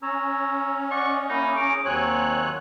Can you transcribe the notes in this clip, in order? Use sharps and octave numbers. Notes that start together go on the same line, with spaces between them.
C#4 C#5 A#5 E6
D5 D#5 F#5 C#6
A#3 D#4 E4
G#4 A#5 C#6 D6
D#2 F#3 C4 C#5 G#5 F#6